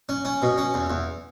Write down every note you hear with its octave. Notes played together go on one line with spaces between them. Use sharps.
C#4
C#4
B2
C#4
E2
E2